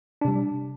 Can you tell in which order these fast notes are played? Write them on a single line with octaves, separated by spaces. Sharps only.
D4 C3 G3